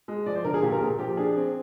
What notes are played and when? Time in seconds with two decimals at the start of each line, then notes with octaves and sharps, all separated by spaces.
0.08 G#3
0.26 F3 D5
0.35 C5
0.44 D3 A#4
0.54 G#4
0.62 A#2 G4
0.72 A#4
0.81 A#2 G#4
0.99 F3 G4
1.17 D4 G#4
1.36 C4